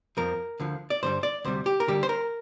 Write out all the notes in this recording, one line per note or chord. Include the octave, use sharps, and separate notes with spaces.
F2 F3 A#4
D2 D3 F3
D5
G2 D3 G3 C5
D5
D2 C3 G3 C5
G4
A#4
D2 D3 G3 G4
C5
A#4